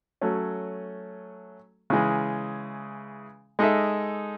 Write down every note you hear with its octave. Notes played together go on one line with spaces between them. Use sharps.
F#3 A3 C#4
C#3 E3 G#3
G#3 D#4 A4 E5